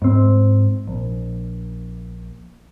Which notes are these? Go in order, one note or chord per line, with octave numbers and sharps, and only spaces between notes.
G#2 C4
A#1